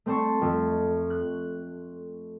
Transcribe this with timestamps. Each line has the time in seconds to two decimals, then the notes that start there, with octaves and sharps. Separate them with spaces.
0.06 A3 C4 C5 A5 C#6
0.41 F2 A3
1.10 F#6